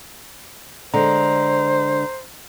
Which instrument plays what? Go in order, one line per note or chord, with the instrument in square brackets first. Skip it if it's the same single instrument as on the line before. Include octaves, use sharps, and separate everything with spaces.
[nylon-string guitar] D3 G#3 [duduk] C5 [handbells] A#5